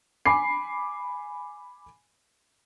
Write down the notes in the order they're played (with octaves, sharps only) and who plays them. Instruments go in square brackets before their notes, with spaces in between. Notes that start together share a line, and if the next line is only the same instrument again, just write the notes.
[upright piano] G#5 B5 D6 C7